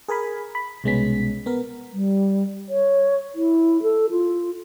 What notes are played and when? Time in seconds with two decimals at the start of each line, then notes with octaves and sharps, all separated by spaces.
0.08 G#4 A#4 G#5 B5
0.55 B5
0.84 C2 B2 G#3 B3 C#4 B6
1.46 B3 A#4
1.93 G3
2.69 C#5
3.35 E4
3.83 A4
4.10 F4